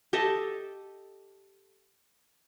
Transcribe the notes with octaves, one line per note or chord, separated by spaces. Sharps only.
G4 A4 D#5 E5